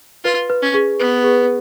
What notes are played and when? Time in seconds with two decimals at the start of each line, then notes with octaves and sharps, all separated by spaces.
0.24 F4 B4
0.50 B4
0.62 C#4
0.74 G#4
0.99 B3 B4
1.24 G#4